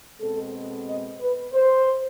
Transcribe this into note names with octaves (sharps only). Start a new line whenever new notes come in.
B2 G#3 C4 A4
D#5
B4
C5